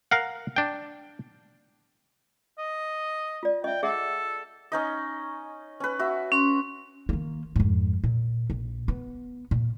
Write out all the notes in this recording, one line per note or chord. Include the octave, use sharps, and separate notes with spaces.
A#4 F5 F#5
D4 G5
D#5
F4 D5
D#5 E5 G5
G#4 A4 E5 F#5
C#4 D#4 D#5
C#4 B4
F#4 E5
C#4 C6
D#3 A#3
F2 G#2
A#2
A#1
B3
A#2